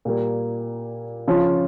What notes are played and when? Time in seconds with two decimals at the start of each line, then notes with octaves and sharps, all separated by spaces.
0.05 A#2 G3 A#3
1.28 C#3 F3 C#4 F4